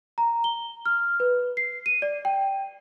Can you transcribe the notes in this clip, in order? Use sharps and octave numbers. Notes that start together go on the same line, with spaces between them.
A#5
G7
F6
B4
C7
D#7
D5
G5